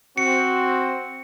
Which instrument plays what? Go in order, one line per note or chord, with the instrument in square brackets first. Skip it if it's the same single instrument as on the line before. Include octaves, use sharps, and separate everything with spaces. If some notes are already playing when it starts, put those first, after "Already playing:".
[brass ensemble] C4 [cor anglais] F#4 [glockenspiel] C#7